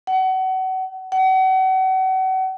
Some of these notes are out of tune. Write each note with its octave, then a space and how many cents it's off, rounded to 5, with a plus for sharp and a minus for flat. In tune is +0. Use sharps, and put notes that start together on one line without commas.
F#5 +30
F#5 +35